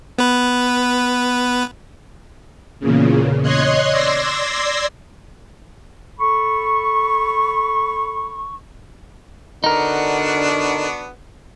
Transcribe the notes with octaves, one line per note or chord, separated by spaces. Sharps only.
B3 B4
E2 A#2 C#3
C#5 D#5 C6 F#6 G#6
D5 C6 E6 G#6 A#6 C7
A4 B5 C#6
D3 B3 D4 D#4 F#4 A#4